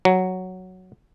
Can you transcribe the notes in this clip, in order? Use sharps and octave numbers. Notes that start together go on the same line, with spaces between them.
F#3